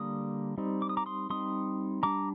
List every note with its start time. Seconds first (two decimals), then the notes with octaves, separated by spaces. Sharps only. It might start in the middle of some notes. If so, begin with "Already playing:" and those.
Already playing: D3 G3 A#3 D#6
0.58 G3 C4 D#4
0.82 D6
0.89 D#6
0.97 A#5 D6
1.06 C6 D#6
1.30 G3 C4 D#4 C6 D#6
2.03 G3 D4 A#5 D6